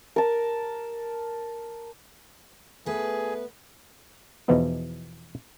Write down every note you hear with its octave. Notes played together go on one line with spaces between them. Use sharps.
A#4 A5
A3 B3 G#4 B4
E2 B2 E3 F3 B3 D#4